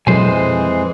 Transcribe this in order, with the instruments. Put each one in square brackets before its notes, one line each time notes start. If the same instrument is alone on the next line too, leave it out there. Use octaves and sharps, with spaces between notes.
[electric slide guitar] F2 C5 G#5 [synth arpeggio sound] B2 F#3 A4 [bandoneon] E3 G#3